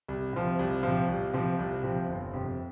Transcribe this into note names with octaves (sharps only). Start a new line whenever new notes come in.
C2
C3 F3
C2
C3 F3
C2
C3 F3 C4
C2
C3 F3 C4
G1
F2 C3